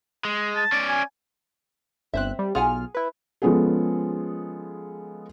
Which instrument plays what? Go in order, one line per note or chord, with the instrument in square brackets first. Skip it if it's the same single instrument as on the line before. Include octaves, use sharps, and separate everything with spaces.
[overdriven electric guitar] G#3
[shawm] A5
[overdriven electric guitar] C#4 D5
[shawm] G#5
[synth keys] G1 F#6 [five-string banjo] C4 C5 E5
[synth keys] G3
[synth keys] B1 F4 F6 [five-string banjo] G#4 F#5 G#5
[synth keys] E4 B4
[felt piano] F3 G#3 B3 C#4 G#4 A4